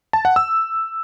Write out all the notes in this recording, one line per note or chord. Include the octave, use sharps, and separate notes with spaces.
A5
F#5
E6